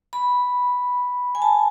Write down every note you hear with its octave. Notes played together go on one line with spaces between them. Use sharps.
B5
G#5
A5